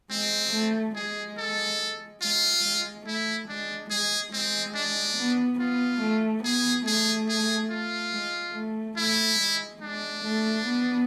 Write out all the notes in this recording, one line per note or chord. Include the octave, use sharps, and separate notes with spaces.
G#3 C4
A3
G#3 G#4
A4
G#3 F4
G#3
A3 E4
G#3 D4
G#3 G#4
G#3 C4
D4
B3
B3 F4
A3
B3 G#4
A3 G#4
G#4
F4
G#3
A3
A3 E4
G#3
G#3 D4
A3
B3